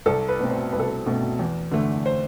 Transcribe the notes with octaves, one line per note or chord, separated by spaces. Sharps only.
C2 A4
B4
B2 A3 C4
C5
C2 B4
A4
B4
B2 A3 C4
E2
D3 A3
C5